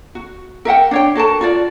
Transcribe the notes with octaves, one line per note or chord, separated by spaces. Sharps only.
F#4
A#4 E5 F#5 G5
D4 C#5 G5
F#4 A4 A#4 A5
F4 F#4 D5